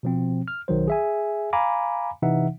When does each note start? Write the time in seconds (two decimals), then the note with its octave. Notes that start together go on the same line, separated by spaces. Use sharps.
0.03 B2 F3 C4
0.48 F6
0.68 B1 D#3 F#3 C5
0.88 G#4 E5 G#5
1.53 F5 G#5 A#5 B5 D6
2.22 C3 E3 D#4 E5 F#5